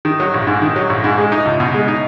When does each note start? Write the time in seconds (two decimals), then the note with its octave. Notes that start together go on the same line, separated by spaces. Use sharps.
0.05 D#3
0.20 F#3
0.34 A#1
0.47 G#2
0.62 D#3
0.76 F#3
0.90 A#1
1.04 G#2
1.18 G#3
1.32 D#4
1.45 C#2
1.60 B2
1.74 G#3
1.88 D#4